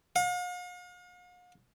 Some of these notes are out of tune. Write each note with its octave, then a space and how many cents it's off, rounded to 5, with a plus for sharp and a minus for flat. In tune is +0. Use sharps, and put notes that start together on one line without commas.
F5 +45